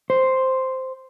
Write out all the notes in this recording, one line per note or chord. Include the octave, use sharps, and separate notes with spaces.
C5